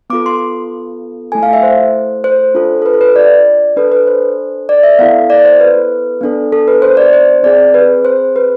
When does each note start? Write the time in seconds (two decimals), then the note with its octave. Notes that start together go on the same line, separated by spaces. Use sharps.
0.10 B3 F4 A4 D6
0.26 C6
1.32 A3 E4 A4 G#5
1.43 F5
1.53 E5
1.63 C5
2.24 C5
2.55 D4 F4 A4
2.82 A4
2.86 B4
2.94 A4
3.01 B4
3.16 D5
3.76 D4 A4 B4
3.92 B4
4.07 C5
4.69 D5
4.83 E5
4.99 B3 E4 A4 F5
5.30 D5
5.45 C5
5.61 B4
6.21 B3 D4 A4
6.52 A4
6.68 B4
6.82 C5
6.97 D5
7.13 C5
7.43 C4 G#4 D5
7.74 B4
8.05 C5
8.36 B4